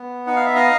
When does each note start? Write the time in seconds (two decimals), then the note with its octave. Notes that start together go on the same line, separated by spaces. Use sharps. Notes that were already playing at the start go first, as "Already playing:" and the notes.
Already playing: B3
0.27 D#4 F#5
0.36 F5
0.46 E5
0.55 D#5 F5